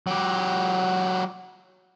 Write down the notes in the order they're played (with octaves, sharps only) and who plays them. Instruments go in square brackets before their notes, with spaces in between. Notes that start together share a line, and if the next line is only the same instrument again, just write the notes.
[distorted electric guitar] F#3 G4